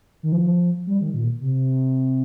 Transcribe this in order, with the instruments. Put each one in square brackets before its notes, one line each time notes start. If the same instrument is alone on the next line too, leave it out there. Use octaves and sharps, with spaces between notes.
[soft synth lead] D#3
F3
G3
D#3
A#2
C3